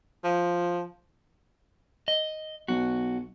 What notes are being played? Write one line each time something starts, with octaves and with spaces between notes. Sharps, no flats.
F3
D#5
B1 F#4